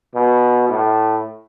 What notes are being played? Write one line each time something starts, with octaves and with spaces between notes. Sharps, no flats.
B2
A2